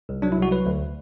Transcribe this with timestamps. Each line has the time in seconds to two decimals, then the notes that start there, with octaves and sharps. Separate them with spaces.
0.09 C2
0.22 F#3 D4
0.32 E4
0.38 C2 F#4
0.51 F#3 B4
0.66 D2